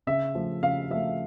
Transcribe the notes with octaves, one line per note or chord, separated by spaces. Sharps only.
C#3 E5
F3 A3
C#3 F5
F3 A3 E5